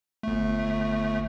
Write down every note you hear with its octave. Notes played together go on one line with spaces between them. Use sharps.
G1 A3